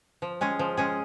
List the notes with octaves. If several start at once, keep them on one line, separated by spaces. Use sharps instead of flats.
F3
G#3 C#4 G#4
F3
G#3 C#4 G#4